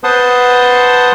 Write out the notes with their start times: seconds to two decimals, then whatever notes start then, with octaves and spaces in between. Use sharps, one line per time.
0.04 B4 C5 F#5 A5 C6 D#6